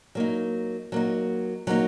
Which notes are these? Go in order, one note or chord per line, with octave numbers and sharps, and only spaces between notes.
F#3 A#3 D#4
F#3 A#3 D#4
F#3 A#3 D#4